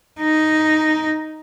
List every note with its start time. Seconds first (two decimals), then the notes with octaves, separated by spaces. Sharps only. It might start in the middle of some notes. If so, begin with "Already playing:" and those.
0.20 D#4